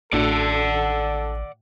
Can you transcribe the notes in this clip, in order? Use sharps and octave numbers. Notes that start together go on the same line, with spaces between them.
A1 A2 D4 F#4 A4 D5 F#5